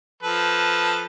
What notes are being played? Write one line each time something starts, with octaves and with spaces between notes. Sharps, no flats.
F3 A4 B4